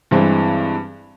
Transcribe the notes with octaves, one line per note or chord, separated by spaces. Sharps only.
G2 E3 G#3 C4